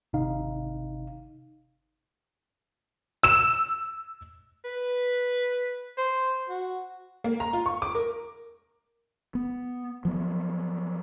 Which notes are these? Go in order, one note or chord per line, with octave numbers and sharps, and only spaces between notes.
G#1 C3 D#4 F5
E6 E7
B4
C5
F#4
A#3
A#5
F4
C#6
D6
A#4
B3
F3 F#3 B3